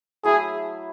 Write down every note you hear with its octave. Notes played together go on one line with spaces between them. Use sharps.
F#3 A3 E4 G#4